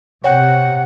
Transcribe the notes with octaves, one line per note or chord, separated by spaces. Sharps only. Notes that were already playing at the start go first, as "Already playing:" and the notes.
C3 C#5 F#5 G5